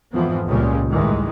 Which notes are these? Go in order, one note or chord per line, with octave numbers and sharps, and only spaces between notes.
G#1 F2 E3 F3 B3
C#2 A#2 C#3 G3 G#3 C#4
A1 D2 G2 D#3 E3 G#3